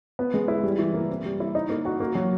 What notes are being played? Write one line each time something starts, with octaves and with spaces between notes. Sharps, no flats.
B3
G#3
E4
G3
E3
A#3
C4
G3
E4
D#4
A#3
F#4
A#3
F#3